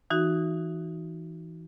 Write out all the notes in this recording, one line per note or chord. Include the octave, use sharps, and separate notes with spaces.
E3 D#4 F#4